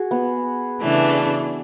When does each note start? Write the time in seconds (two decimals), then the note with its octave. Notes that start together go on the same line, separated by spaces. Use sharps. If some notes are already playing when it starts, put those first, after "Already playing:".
Already playing: F#4 G#4
0.11 B3
0.80 C#3 E3 A3 D4